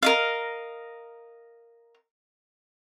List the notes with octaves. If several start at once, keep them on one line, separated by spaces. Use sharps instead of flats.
A#4 D#5 F5